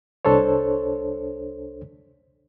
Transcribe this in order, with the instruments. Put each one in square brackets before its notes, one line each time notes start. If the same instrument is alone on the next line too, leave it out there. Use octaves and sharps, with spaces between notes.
[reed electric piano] C2 D4 A4 C5 C#5